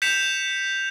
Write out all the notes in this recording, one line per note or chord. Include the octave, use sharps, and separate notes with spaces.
G6 B6 C#7 E7 F7